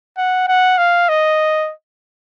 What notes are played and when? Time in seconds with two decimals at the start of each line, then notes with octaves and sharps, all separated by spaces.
0.17 F#5
0.48 F#5
0.78 F5
1.09 D#5